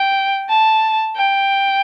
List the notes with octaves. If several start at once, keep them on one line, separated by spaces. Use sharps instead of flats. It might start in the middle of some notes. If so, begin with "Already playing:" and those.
Already playing: G5
A5
G5